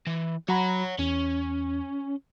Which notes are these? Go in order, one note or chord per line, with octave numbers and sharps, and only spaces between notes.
E3
F#3 C#5 F#5 A#5 B5
E2 C#4